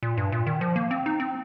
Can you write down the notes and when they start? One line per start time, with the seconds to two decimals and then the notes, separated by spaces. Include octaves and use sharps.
0.03 A#2
0.17 G2
0.32 A#2
0.47 D#3
0.61 F3
0.76 A#3
0.91 C4
1.06 D#4
1.20 C4